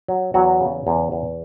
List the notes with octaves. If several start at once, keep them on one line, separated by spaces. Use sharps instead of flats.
F#3
E2 F#3 F#4
C#3
E2
E2